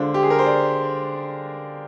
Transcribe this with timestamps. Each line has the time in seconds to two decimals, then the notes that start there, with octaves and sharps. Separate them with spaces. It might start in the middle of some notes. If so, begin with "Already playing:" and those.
Already playing: D3 G#3 D4 F4 C5
0.14 G4
0.23 G#4
0.30 A#4
0.39 C5
0.46 D5